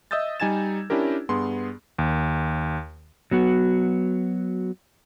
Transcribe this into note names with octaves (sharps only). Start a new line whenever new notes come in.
D#5 E5 D#6 E6 G6 A6
G3 D#4 G#5 G#6 A6 E7
C#4 D4 E4 G4 A#4
G2 B3 G#4 C6
D#2
F#3 B3 F#4